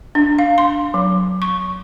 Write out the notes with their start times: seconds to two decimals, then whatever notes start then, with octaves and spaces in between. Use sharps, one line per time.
0.15 D4
0.39 F5
0.58 C6
0.94 F#3
1.42 C#6